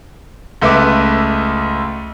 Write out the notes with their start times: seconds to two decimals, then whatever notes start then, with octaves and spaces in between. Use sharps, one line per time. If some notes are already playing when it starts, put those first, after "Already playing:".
0.62 C#2 A3 B4 E5 D6